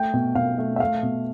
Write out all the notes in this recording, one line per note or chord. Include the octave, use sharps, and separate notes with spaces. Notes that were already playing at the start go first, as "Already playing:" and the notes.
Already playing: A3 G5
B2
B2 F5
A3
E5
A3 F5
B2